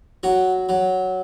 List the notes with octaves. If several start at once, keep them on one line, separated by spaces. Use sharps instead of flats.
F#3 F#4
F#3